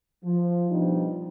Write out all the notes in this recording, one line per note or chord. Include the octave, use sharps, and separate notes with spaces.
F3
B2 F3 G3 D4 D#4